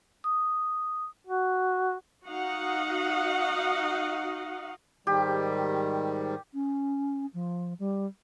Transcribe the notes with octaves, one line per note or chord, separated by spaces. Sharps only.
D#6
F#4
D#4 F#4 D#5 F5 F#5
G#2 D#3 G3 G4
C#4
F3
G3